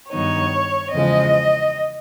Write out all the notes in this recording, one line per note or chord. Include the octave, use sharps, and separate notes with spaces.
G2 D#3 F#3 B3 D#4 C#5
E2 C#3 F3 G#3 D#5